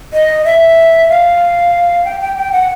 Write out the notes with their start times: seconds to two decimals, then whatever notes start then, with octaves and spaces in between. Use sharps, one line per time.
0.13 D#5
0.45 E5
1.09 F5
2.05 G5
2.21 G5
2.37 G5
2.52 F#5